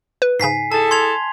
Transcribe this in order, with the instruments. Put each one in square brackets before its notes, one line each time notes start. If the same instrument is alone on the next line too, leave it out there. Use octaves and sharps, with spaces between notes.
[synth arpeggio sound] B4
[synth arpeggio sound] G#2 C#3 [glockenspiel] G#5 B6 C7
[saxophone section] E4 G#4 A4 [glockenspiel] A5
[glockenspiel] C6 G#6 F7